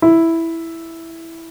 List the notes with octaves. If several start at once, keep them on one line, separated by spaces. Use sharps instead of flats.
E4